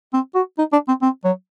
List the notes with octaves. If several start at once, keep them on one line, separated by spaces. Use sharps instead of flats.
C4
F#4
D#4
D4
C4
C4
F#3